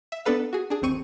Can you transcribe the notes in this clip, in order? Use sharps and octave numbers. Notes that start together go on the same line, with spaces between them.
E5
B3 D4 A4 B4 F5
F#4 G#4
D4 G#4
G1 D#2 C4 C#6 D#7